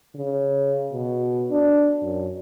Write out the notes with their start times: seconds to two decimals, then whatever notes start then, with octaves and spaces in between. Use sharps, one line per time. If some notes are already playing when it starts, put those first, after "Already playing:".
0.15 C#3
0.93 B2
1.51 D4
2.02 F#2